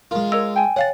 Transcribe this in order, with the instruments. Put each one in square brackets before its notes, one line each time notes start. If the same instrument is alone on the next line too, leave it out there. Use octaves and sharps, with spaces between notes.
[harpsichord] G#3 F4 [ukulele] A#4
[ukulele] A#4 C#5 D#5 [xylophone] E6
[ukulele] G5 G#5
[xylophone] C#5 F5 A6 [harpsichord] F#5